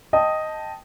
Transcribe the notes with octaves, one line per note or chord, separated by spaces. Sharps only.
D#5 G5 A5 D#6